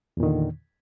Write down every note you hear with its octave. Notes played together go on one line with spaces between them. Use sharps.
E2 A#2 D3 D#3